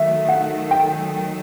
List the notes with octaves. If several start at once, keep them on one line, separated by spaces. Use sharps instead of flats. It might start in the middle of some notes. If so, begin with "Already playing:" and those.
Already playing: D#3 F#3 A3 E5
F#5
G5